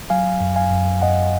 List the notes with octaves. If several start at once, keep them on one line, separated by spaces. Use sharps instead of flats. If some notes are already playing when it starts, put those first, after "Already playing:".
F#3 F5 G#5
F#2
F5 G#5
F#2
F#2 D#5 F#5